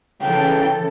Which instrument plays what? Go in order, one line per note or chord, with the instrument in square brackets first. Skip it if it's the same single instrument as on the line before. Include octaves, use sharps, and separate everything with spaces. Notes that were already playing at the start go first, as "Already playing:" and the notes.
[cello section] C#3 E3 A4 [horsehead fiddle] G5